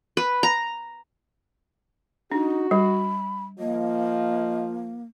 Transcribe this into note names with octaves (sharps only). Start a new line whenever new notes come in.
B4
A#5
D4 D#4 F#4
G3 B5
F3 A#3 D#5